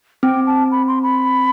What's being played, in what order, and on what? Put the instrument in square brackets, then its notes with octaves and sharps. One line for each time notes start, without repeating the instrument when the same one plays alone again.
[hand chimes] C4 [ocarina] G5
[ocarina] A5
B5
C6
B5